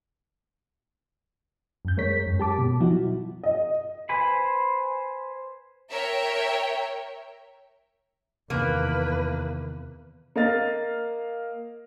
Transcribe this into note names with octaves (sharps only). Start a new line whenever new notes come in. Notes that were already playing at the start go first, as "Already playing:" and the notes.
F#2 G6
G#3 A#4 C#5 B6
F#2
G4 A5 D6
B2
F3 F#3 D#4 E4 F#4
D#5
B4 C5 G#5 B5
A#4 C#5 E5 G5
E2 C3 D#3 A#3 B4
A#3 D#5 F5 A6